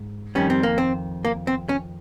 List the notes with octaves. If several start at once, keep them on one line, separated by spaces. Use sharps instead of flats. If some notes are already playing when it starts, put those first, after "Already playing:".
Already playing: G#2
F2 D#3 G3 C#4
C4
A#3
C4
A#3
C4
C#4